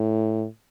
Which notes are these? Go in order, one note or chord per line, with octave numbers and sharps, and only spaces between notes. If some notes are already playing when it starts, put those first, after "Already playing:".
Already playing: A2